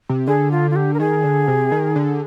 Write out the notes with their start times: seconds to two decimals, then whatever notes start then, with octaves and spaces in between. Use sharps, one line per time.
0.09 C3
0.27 D3 G#4
0.51 F4
0.71 F4
0.76 G4
0.94 A#4
1.00 D#3 G#4
1.24 D3
1.48 C3
1.72 D#3
1.96 D3